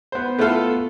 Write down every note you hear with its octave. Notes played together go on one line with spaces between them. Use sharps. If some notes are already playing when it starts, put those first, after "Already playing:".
B3 C5
A3 B3 E4 F4 A4 F5